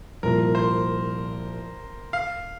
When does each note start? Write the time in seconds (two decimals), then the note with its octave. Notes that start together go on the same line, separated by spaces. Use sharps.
0.23 C2 A#2 F3 A#4
0.55 C5
2.13 F5